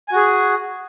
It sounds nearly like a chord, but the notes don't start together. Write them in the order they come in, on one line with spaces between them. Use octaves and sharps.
G#5 F#4 G#4